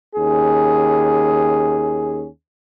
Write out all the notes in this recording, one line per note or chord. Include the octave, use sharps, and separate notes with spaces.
D#2 C#4 G#4